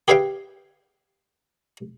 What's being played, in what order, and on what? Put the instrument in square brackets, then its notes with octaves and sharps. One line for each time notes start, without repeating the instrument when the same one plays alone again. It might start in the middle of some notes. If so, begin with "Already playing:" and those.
[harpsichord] G4 G#4 B4 E5 F5 G5